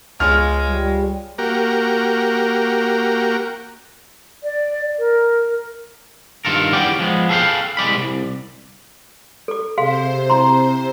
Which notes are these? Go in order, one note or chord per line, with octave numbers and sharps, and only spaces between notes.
C#2 G#3 F4 C#5 F6
G3
A#3 F#4 G4 A#4
D5
A#4
G2 D#3 F4 A4 A#4
E2 B3 C#4 G4 D5 G5
F3 G#3 B3
G#4 A4 B4 C5 F5 G5
C2 G#3 D5 B5
C2
A4 D6
C3 G#4 C5 F5 C6
E4 A#5 C6